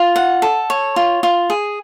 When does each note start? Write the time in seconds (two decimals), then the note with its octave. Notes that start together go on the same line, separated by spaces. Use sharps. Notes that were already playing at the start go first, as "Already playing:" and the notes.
Already playing: F4
0.16 F#5
0.42 A4
0.70 C#5
0.96 F4
1.23 F4
1.50 G#4